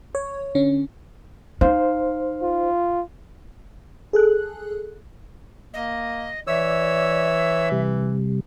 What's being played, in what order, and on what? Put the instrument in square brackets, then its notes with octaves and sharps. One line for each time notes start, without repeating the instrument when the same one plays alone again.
[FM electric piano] C#5
D3 C#4
[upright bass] D#4 [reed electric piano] C5 [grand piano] F5
[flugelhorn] F4
[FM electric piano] G#4 A4 F#6
[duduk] A#3 [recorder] D#5
[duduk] E3 [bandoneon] C#5 E6 [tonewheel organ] D5 [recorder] E5
[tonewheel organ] C3 G3